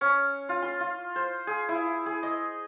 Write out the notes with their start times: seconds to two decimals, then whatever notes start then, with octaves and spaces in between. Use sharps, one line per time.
0.01 C#4
0.49 F4
0.62 C6
0.80 F4
1.16 C5
1.47 G#4
1.69 E4
2.06 G#4
2.23 D#5